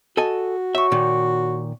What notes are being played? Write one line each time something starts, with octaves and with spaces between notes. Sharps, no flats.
F#4 A4 D#5 G#5
C#5 E5 C#6
A#2 D#3